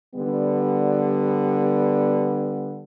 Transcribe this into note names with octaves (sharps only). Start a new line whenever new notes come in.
D3 G3 B3